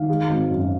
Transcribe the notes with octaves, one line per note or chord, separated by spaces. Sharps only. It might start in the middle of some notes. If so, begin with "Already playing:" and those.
Already playing: D#3 F5
G#3
G#1
F#2